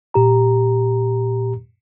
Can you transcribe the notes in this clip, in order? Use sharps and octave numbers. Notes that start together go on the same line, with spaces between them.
A#2 G4 A#5